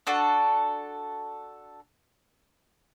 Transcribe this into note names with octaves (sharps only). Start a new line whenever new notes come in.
D4 F#4 A4